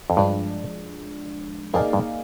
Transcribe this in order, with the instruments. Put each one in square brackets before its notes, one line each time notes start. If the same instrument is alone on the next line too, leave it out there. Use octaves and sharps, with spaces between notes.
[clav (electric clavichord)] F2
[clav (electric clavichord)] G2 [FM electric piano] F3 G#3 D4
[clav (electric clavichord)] F2 [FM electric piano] A#3 D#4 G#4 D5 F5
[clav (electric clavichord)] G2